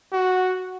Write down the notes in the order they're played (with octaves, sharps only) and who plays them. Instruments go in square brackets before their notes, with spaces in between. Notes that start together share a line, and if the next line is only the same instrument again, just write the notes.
[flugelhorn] F#4